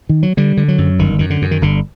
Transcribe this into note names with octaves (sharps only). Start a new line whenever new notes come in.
D#3
F#3
D3 G3
D3
F#3
F#2
G1 D#3
F#2 D#3
D3
F#2
D#3
G1 D3